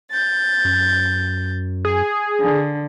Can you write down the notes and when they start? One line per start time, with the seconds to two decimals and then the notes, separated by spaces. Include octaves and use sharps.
0.11 G6 A6
0.65 F#2
1.85 G#4
2.41 D3